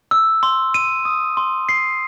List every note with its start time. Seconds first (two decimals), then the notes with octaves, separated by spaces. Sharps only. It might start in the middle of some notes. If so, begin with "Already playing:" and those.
0.11 E6
0.43 C6
0.74 D#7
1.05 D#6
1.37 C6
1.69 C7